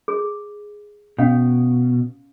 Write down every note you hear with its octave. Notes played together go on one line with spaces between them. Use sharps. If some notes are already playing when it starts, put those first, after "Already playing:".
G#4
B2 C#4 F5